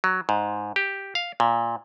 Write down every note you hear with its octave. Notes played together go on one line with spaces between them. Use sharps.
F#3
G#2
G4
F5
A#2